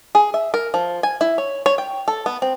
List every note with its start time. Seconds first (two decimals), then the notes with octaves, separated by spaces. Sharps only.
0.15 G#4
0.34 E5
0.54 A#4
0.74 F3
1.03 G#5
1.21 E4
1.38 C#5
1.66 C#5
1.78 G5
2.08 A4
2.26 B3
2.42 C4